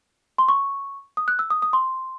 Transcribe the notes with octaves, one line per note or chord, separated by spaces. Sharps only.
C6
C#6
D#6
F#6
E6
D#6
D#6
C6